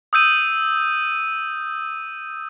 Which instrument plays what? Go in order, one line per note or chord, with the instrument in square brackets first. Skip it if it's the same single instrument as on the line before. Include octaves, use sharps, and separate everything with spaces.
[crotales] D#6 E6 G6 D#7